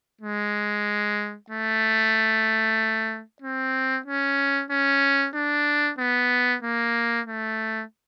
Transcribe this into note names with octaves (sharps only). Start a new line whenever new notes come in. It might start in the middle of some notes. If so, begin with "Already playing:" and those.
G#3
A3
C4
C#4
C#4
D4
B3
A#3
A3